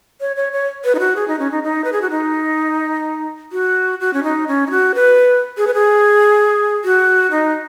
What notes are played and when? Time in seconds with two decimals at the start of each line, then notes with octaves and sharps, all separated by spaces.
0.21 C#5
0.36 C#5
0.53 C#5
0.85 B4
0.95 D#4
0.99 F#4
1.16 G#4
1.28 D#4
1.39 C#4
1.51 D#4
1.63 D#4
1.84 B4
1.93 G#4
2.02 F#4
2.10 D#4
3.52 F#4
4.01 F#4
4.13 C#4
4.23 D#4
4.48 C#4
4.67 D#4
4.71 F#4
4.95 B4
5.57 G#4
5.67 B4
5.74 G#4
6.85 F#4
7.31 D#4